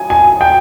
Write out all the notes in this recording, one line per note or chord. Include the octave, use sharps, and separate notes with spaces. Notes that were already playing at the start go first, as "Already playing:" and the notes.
Already playing: G#5
G#5
G5